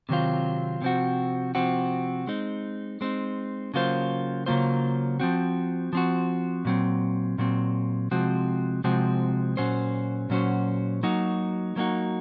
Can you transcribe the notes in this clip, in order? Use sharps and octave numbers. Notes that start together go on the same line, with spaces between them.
C3 D#3 F#3 C4 F4
C3 F3 C4 F#4
C3 F3 C4 F#4
G#3 C4 D#4
G#3 C4 D#4
C#3 F#3 A#3 F4 C5
C#3 F#3 A#3 F4 C5
F3 C4 F#4
F3 C4 F#4
A#2 F#3 C4
A#2 F#3 C4
C3 F3 G#3 C4 F#4
C3 F3 G#3 C4 F#4
A#2 F#3 C#4 F#4 C5
A#2 F#3 C#4 F#4 C5
F#3 A#3 D#4 F#4
F#3 A#3 D#4 F#4